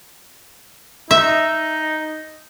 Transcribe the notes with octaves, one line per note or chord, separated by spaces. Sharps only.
D#4 E5